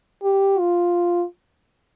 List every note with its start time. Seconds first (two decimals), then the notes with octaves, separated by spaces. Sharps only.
0.23 G4
0.59 F4